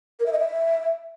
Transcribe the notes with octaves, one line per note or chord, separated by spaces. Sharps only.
A#4
E5
D#5
E5